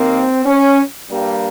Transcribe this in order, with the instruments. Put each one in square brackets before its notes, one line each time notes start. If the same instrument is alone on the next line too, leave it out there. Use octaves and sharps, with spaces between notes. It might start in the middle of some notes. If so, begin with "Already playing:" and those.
Already playing: [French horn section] D#2 D#3 A#3 C4
C#4
G2 G3 A#3